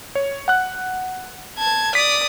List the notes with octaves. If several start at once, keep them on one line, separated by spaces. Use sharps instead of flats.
C#5
F#5 F#6
A5 G#6
D5 D#6 B6